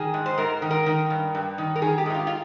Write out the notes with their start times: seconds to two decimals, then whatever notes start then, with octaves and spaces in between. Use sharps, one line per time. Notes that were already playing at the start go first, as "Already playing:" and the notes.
Already playing: D#3 G#4
0.14 G#2
0.26 C5
0.38 G#2 A#4
0.62 D#3
0.71 A#4
0.86 D#3
1.10 G2
1.35 G2
1.58 D#3
1.76 A#4
1.82 D#3 G#4
1.98 G4
2.06 G#2 D#4
2.14 F4
2.27 F4